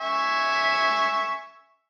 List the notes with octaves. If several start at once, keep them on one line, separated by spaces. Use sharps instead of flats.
E5 G#5 C#6